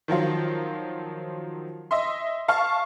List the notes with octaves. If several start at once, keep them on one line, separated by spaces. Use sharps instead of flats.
D#3 F3 F#3 F4
D#5 E5 C6
F5 A5 C#6 F6